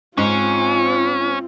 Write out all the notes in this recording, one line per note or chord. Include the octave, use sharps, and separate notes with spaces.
G#2 C4 C#4 F4